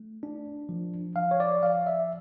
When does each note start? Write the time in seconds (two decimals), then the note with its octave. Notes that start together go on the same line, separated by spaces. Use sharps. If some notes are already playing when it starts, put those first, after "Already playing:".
Already playing: A3
0.23 D4
0.69 F3
1.16 F3 F5
1.31 C#5
1.40 D5
1.63 F3 F5
1.87 E5